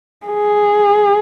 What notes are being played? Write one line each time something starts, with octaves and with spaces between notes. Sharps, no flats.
G#4